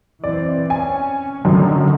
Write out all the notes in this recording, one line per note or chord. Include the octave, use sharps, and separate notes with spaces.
E3 C4 D5
C#4 G#5
F#2 D3 D#3 F#3 A3